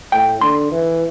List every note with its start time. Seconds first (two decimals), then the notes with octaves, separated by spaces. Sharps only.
0.12 A2 G5
0.41 D3 C6
0.72 E3